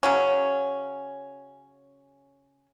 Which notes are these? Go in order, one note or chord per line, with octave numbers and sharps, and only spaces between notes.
C#3 F#3 C#4